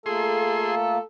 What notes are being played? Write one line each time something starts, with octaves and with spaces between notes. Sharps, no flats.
A3 A#3 F4 G#4 A4 C6